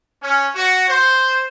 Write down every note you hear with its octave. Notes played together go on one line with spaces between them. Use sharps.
C#4
F#4
C5